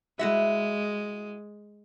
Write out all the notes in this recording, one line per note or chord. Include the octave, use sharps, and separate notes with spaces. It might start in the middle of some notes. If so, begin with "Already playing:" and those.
G#3 E4 F#4 E5